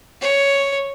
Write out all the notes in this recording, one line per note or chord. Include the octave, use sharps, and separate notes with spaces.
C#5